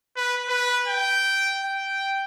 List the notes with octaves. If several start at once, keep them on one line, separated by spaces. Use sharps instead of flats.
B4
B4
G5
G5